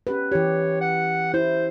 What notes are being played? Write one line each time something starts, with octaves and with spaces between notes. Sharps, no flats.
C#4 G4 B4
E3 G4 C#5
F#5
E4 C5